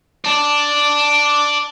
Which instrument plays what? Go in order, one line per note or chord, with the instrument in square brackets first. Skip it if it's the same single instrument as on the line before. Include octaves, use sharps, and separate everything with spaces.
[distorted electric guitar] D5 A5